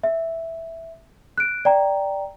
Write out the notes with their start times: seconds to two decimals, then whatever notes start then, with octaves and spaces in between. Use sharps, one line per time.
0.03 E5
1.38 F#6 D7
1.65 D5 G5 A#5